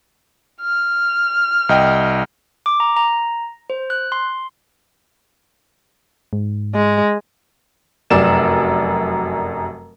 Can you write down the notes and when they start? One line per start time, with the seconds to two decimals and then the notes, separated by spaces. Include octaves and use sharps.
0.61 F6
1.69 C2 D#5 G5
2.66 D6
2.80 A#5
2.96 A#5
3.70 C5
3.90 F#6
4.12 C6
6.33 G#2
6.75 G#3
8.10 F1 F#2 D5 E7